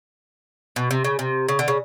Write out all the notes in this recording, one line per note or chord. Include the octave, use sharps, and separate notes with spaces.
B2
C3
C#3
C3
C#3
D3
C#3